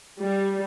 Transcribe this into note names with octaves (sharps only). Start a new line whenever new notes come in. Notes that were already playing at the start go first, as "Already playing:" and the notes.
G3